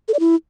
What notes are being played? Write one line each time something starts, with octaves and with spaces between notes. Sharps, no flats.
A4
D5
E4